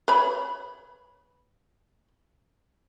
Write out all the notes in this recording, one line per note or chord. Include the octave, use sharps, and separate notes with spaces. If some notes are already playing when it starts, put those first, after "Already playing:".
B4 C#5 B5